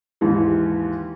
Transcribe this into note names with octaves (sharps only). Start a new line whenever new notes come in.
D#2 G#2 E3